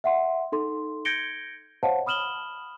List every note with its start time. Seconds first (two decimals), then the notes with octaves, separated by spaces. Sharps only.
0.04 E5 F#5 C6
0.52 D#4 A4 C6
1.05 G6 G#6 A#6 C#7 D7 G7
1.83 C5 C#5 D#5 F5 F#5 A5
2.06 B5 D#6 F6 E7 F#7 G7